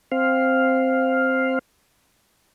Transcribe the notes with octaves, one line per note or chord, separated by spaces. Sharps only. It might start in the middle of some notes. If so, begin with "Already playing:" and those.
C4 F5